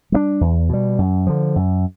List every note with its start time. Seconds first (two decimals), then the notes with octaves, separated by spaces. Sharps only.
0.12 G3 B3 D4
0.41 E2
0.69 B2 G3
0.99 F#2
1.27 D3 F3
1.56 F#2